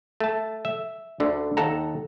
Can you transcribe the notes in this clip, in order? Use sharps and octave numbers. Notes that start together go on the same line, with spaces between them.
A3 A5
E5
D2 D3
D#2 A4 F#5 A#5